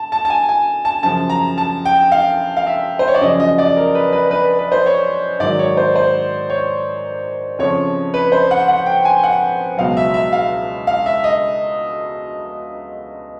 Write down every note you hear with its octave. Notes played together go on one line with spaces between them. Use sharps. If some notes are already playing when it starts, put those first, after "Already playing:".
Already playing: A5
A5
A5
G#5
G#5
A5
F#2 C#3 F3 A5
A#5
A5
G5
F5
F5
E5
C5
C#5
D5
F#2 C#3 F3 D#5
D#5
D5
A#4
B4
B4
B4
B4
C5
C#5
G#2 D#3 F#3 D5
C#5
C5
C5
C#5
F2 C#3 F3 C#5
B4
C5
F#5
F#5
G5
G#5
F#5
C#2 B2 F#3 F5
E5
E5
F5
F5
E5
D#5